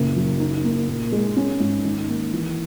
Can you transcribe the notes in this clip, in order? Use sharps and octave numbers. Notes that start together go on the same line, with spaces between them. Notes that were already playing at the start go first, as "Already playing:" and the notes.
Already playing: F#1 A#2
F#3
D#4
A#3
A#2
G#3
C#4
G#2
D#3
A#3
E3